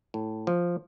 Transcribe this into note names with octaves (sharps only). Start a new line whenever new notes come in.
A2
F3